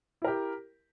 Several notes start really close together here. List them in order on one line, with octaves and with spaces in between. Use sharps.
E4 A#4 G4